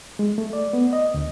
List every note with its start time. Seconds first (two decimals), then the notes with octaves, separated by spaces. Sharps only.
0.19 G#3
0.38 A3
0.53 D5
0.73 B3
0.93 D#5
1.14 D2